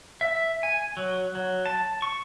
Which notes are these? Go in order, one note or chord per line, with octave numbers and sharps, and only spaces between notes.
E5
G#5
F#3
F#3
A5
C#6